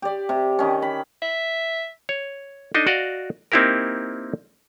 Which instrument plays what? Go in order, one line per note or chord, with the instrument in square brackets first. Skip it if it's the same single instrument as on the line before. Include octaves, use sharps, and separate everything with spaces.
[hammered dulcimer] G4 D5
C3
D#3 C#4
B5
[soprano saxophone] E5
[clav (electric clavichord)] C#5
D4 D#4 A4 D#5
F#4 D5 D#5 F5 F#5
A#3 C4 D#4 E4 G4 A#4